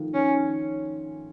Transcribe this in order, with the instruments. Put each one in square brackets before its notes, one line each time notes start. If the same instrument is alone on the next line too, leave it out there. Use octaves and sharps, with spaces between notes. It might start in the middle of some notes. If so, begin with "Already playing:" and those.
Already playing: [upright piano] D#3 F3 A3
[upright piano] D#3 [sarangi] C#4